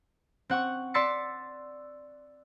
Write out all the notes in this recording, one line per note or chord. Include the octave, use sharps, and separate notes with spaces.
C4 F#5 C#6
D5 C6 E6 A6 B6 C#7